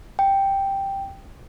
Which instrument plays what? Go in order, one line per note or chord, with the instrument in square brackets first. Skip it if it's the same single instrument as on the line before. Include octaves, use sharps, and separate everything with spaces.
[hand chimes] G5